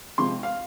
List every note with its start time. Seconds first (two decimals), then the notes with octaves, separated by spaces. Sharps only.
0.18 C3 F3 G#3 C6
0.43 F5